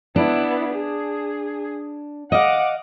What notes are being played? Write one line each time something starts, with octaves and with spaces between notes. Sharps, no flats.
B3 D4 E4
G#4
D#5 F5 F#5 D6